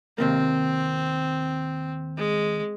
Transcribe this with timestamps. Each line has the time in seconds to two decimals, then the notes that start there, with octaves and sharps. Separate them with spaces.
0.18 D#2 C3 A#3 C4
2.17 G#3